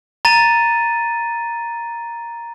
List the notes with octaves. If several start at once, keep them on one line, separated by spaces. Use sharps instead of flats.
A#5 A6 D#7